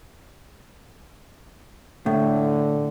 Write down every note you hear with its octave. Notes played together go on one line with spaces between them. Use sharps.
A2 D3